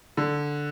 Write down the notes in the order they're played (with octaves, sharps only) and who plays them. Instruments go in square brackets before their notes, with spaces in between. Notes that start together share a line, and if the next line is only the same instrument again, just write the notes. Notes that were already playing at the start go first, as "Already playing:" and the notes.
[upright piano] D3